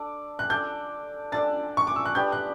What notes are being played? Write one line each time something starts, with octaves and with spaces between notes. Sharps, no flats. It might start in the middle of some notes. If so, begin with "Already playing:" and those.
Already playing: D4 A4 D5
F#6
D4 A4 D5 G6
D4 A4 D5 A6
C#6
D6
E6
F#6
B3 D4 G4 D5 G6
F#6